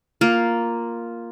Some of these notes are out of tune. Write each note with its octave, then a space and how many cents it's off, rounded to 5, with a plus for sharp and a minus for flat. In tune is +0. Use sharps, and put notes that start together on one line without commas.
A#3 +0 F4 +0